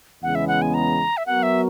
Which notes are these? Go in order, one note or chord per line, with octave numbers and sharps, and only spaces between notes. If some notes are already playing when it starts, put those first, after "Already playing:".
E2 C#3 G#3 B3 F#5
E5
F#5
G#5
A#5
E5
F#3 B3 F#4 A#4 F#5
E5